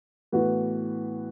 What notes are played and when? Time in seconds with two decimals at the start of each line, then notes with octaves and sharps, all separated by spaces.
0.32 A2 E3 B3 F#4